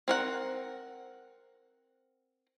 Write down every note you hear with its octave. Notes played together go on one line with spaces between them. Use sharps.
C4 A#4 F#5